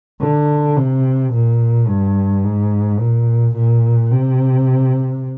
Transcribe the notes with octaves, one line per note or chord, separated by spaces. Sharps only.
D3
C3
A#2
G2
G#2
A#2
A#2
C3